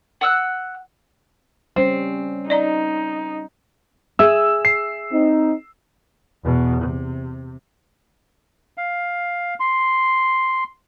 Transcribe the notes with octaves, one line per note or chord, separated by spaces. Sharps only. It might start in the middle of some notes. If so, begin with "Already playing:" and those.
F#5 E6 F#6
G3 C4 C#4
D#4 D5 D#5 A#5
G#4 E5 E6
C7
C4 D#4
E2 B2
C3
F5
C6